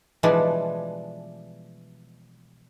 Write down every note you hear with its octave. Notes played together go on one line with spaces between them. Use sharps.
B2 E3 F3 G3 G#3 D4